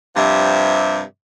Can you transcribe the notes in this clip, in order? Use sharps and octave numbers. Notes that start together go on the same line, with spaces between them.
G2 C3 F3 E5